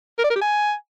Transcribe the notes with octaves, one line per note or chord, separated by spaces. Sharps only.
A#4
D5
A#4
G4
G#5